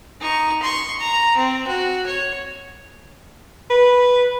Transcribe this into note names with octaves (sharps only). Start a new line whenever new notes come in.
D#4 C#6
C6 C#6
A#5
C4
F#4
C#5
B4